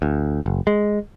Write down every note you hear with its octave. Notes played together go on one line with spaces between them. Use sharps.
D2
F#1
G#3